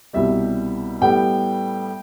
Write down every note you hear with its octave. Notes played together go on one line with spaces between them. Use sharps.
C2 B2 G3 E5
A2 G3 B3 G5